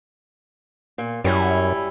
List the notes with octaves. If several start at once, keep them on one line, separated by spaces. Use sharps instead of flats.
A#2
F#2 G3 C#4 E4